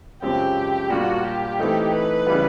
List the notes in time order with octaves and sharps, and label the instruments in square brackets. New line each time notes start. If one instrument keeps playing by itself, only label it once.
[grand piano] F#2 C#3 F3 G#3 C4 [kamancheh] G4
[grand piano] A#2 G3 A#3 D4 F4 [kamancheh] F#4
[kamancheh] G4
[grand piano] E3 A3 C4 D#4
[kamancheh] B4
[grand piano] C#3 E3 G3 B3